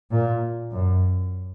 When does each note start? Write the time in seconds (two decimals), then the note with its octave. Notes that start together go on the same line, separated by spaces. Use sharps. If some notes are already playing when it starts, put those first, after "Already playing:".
0.11 A#2
0.72 F#2